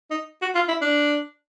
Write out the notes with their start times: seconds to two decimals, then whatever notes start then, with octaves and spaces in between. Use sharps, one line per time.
0.11 D#4
0.42 F#4
0.55 F4
0.68 E4
0.82 D4